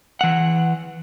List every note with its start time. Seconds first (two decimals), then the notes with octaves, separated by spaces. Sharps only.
0.21 E3 F#5